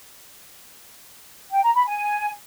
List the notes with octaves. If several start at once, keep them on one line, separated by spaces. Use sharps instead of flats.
G5
A#5
B5
G#5